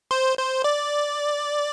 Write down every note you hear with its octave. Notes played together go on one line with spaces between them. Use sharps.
C5
C5
D5